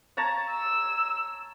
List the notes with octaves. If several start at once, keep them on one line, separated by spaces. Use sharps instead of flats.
C#5 A5 A#5
E6